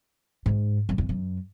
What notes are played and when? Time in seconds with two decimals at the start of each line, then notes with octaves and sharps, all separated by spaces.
0.46 G#2
0.89 F#2
0.98 E2
1.09 F#2